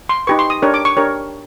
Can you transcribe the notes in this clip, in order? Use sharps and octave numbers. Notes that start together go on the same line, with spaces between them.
C6
D#4 G4 B4 C#6
C6
D#6
D4 G4 A#4 C#5
D6
C#6
D4 G4 A#4 C#5